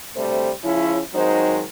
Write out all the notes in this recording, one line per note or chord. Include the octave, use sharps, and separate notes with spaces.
D2 C3 G3 A3 C5
C#3 F3 C#4 E4
D#3 F#3 G#3 C4 D#4 C5